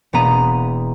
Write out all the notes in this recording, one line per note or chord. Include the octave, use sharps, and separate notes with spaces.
E1 A#3 B3 A#5 D#7